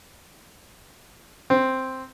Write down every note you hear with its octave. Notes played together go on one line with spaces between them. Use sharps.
C4